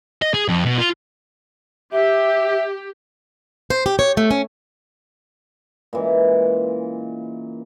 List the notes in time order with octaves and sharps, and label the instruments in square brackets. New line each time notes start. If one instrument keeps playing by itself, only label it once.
[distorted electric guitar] D#5
G#4
F2
B2
F4
[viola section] G4 [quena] E5
[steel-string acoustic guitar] C5
G4
C#5
A3
C#4
[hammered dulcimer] A#2 C#3 E3 G#3